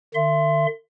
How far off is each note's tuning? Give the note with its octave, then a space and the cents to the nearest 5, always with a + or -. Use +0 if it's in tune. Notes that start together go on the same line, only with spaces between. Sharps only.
D3 +45 E5 +30 C6 +0